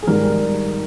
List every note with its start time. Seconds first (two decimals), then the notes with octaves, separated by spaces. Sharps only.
0.02 G#4
0.07 G#1 G#2 G3 A#4